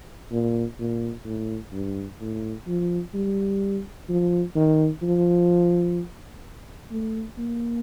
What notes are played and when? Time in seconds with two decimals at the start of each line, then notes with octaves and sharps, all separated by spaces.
0.32 A#2
0.79 A#2
1.25 A2
1.73 G2
2.21 A2
2.67 F3
3.14 G3
4.09 F3
4.55 D#3
5.03 F3
6.91 A3
7.38 A#3